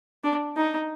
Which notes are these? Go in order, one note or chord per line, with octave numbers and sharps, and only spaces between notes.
D4
D#4